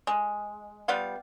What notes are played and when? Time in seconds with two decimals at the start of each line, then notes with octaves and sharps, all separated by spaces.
0.07 G#3
0.88 G3 B3 F4 F5